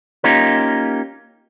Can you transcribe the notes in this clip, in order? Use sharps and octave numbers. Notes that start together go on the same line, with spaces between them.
A#3 C#4 D#4 F4 G4 A#4